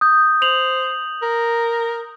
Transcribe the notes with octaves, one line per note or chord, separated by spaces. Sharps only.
D#6 G6
C5 F7 F#7
A#4